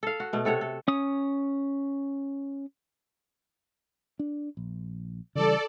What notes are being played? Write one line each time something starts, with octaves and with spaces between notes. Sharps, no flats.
A4 F5
F#4
B2 A3
C3 A4 C#5 F#5
A4
C#4 D#6
D4
A#1
C#3 E3 G3 A4 D5